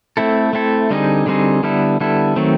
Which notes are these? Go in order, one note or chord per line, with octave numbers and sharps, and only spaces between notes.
A3 C4 E4 A4
A3 C4 E4 A4
D3 G3 C4 D#4 G#4
D3 G3 C4 D#4 G#4
D3 G3 B3 E4 A4
D3 G3 B3 E4 A4
D#3 F#3 A3 C4